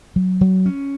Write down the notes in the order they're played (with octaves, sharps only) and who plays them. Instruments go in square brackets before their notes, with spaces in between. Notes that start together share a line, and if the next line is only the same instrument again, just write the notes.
[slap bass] F#3
F#3
C#4